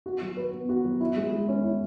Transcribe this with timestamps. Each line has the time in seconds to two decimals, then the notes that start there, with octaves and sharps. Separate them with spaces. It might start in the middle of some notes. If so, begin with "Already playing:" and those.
0.06 F#4
0.21 F#3
0.37 B4
0.53 B3
0.69 F#4
0.84 F#3
1.01 E4
1.17 G#3
1.32 G#3
1.49 C#4
1.64 E4